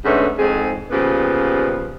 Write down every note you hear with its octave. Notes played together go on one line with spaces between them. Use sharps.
G#2 D3 A3 B3 C#4
F2 G#2 G#4
A#2 C#3 F3 G3 B3 G4